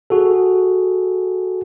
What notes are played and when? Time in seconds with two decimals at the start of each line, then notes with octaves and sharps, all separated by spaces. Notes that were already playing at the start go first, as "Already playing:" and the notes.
0.10 F#4 G#4 A4